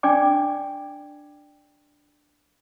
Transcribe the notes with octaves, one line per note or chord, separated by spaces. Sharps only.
D4 D5 G5 G#5 D6